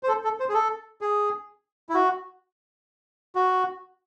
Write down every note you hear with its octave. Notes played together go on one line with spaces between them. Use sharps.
C5
A4
A4
C5
G#4
A4
G#4
E4
F#4
F#4